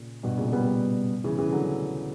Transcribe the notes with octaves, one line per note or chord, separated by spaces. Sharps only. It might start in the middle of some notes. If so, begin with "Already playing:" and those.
Already playing: A#2 C#3
G2 B2
A#2 C#3
G3 B3
C#3 E3
C#3 E3
D3 F#3